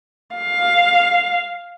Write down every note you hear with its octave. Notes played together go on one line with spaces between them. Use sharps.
F5